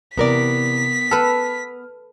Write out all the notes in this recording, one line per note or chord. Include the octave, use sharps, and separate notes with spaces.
C3 E3 B3 A#4 D5 B6
A4 B4 F6